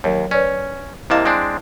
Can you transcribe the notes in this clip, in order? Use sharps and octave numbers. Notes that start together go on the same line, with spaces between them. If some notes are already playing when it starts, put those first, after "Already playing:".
D#2 F#3 A#4 C#5
C#4 B4 C#5 D5
C3 A#3 E4 D#5 F5 A5
G#3 C4 D4